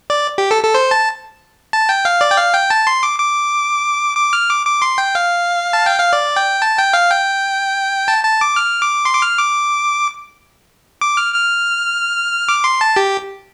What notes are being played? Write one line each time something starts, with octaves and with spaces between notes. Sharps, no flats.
D5
G4
A4
A4
C5
A5
A5
G5
F5
D5
G5
F5
G5
A5
C6
D6
D6
D6
F6
D6
D6
C6
G5
F5
A5
G5
F5
D5
G5
A5
G5
F5
G5
A5
A5
D6
F6
D6
C6
D6
F6
D6
D6
F6
F6
D6
C6
A5
G4